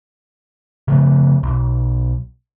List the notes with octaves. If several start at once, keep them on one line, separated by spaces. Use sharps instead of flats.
C#3 F3 A3
B1